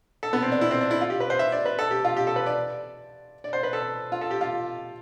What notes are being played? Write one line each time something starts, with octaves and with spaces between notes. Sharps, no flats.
A4
B3
C4
D4
E4
C4
D4
E4
F4
G4
B4
C5
E5
D5
B4
A4
G4
F4
G4
A4
B4
D5
D5
C5
B4
A4
F4
A4
G4
F4